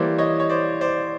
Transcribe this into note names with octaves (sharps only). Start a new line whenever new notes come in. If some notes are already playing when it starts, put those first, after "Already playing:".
Already playing: E3 G3 A#3 C5 D5
C#5 D#5
C#5
C5 D5
C5 D5